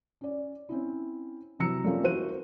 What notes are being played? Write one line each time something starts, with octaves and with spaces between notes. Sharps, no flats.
C#4 D5
C4 C#4 E4
C3 E3 F#3 A#5 E6 C#7
G3 A3 A#3 C4 C#4 F4
E3 F#4 A#4 C5 F#6 D#7